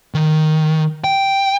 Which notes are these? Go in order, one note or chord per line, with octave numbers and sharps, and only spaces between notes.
D#3
G5